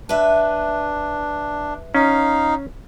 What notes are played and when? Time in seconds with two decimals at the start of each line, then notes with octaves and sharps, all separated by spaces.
0.09 D4 B4 E5
1.95 C#4 D#4 F5